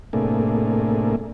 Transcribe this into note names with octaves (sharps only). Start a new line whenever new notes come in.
A2 C3 A3 A#3 D4 G#4